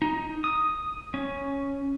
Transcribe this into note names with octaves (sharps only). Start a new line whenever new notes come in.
D#4
D#6
C#4